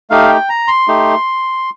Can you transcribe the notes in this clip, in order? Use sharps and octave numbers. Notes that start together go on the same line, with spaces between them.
A3 D#4 G4 F5
G5
A#5
C6
A3 D#4 G4